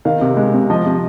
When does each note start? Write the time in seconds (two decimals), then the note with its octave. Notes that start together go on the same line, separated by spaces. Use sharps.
0.05 D#3 F5
0.21 C3
0.37 G#3
0.54 C3
0.70 F3 D#5
0.86 C3